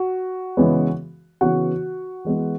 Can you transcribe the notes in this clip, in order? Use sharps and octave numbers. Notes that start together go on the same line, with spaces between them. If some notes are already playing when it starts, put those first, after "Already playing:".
Already playing: F#4
C#3 E3 G#3 B3
C#3 E3 B3 F#4 F#5
E3 G#3 B3